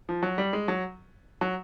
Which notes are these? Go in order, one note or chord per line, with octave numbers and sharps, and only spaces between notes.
F3
F#3
G3
G#3
F#3
F#3